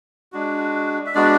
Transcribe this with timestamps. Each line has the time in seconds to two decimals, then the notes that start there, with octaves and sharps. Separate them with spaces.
0.32 G#3 D4 F#4
1.06 E5
1.15 G#3 B3 D4 F#4 D5